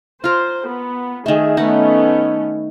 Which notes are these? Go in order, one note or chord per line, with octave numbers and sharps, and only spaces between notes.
F4 A#4 C5
B3
D#3 A3 G#4
A3 B3 C#4 D#4 F#5